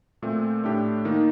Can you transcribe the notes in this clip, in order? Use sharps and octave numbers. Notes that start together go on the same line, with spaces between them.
A#2 A3 C4
A2 A3 D4 G4
D#3 A#3 D#4